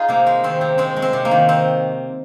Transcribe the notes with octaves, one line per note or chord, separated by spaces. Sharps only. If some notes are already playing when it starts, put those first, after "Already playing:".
Already playing: D#4 F4 G#4
C3 A#3
G#3
D#3 C4
C3
G#3 C4
G#3
C4
C3
A#3
D#3
C4